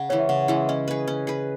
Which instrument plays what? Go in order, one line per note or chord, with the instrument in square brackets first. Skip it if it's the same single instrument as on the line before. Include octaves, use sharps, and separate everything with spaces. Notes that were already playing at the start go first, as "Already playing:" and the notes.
Already playing: [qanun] C#3 [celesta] F#5
[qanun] E3 G#3 C#4 [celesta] C#5
[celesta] E5
[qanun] C#3 [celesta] F#5
[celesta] F#5
[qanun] E3 G#3 C#4
[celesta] E5
[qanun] C#4 [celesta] D#5
[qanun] G#4 B4
C#4
G#4 B4